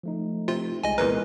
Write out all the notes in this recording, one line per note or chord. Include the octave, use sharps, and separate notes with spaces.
F3 A3 D#4
C3 F4
C2 G#3 D#5 G#5
E2 A#2 A#4 B4